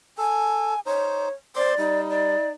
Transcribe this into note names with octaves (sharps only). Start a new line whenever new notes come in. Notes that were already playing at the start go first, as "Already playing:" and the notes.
A4 G#5
D#4 C5 C#5
C5 D5 C6 D6
G3 D#4
D5